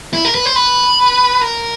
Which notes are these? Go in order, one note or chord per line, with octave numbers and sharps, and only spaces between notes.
E4
A#4
B4
C5
B4
A#4